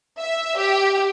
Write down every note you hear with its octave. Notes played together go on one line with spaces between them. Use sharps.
E5
G4